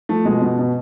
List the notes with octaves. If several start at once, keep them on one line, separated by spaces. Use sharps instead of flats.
F3 A3
B2 G#3
B2
B2